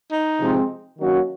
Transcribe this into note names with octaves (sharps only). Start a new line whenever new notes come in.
D#4
C3 F3 G#3 C4
D#3 F#3 A#3 C#4 F#4